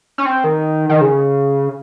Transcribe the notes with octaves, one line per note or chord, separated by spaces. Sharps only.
C#4
C4
D#3
D#3
C#3